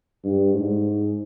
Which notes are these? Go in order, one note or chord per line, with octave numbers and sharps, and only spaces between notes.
G2
G#2